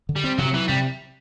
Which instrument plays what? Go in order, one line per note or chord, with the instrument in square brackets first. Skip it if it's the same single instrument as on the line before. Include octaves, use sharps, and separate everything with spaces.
[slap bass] D3
[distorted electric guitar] G3
[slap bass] C4
[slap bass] C3 [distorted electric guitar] F#3
[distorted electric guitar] E3 [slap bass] F#3
[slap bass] C3 [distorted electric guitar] G3